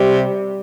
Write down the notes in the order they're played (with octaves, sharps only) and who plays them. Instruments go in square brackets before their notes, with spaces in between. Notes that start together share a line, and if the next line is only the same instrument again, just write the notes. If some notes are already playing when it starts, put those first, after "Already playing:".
Already playing: [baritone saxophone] C3 [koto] G3